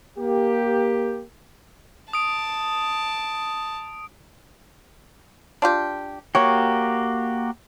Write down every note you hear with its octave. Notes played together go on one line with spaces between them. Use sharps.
A#3 G4
A5 D#6 D7
D4 F4 G4
A#3 F#4 G4 C#5